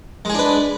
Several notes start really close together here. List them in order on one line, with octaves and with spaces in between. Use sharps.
G#3 G#4 D4 B4